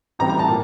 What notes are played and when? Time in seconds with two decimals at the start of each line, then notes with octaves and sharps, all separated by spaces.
0.19 A2 E3 G3 C4 A#5
0.29 A#5
0.39 A5
0.48 A#2